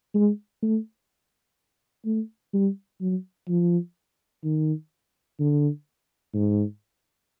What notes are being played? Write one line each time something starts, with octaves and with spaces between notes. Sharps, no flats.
G#3
A3
A3
G3
F#3
F3
D#3
D3
G#2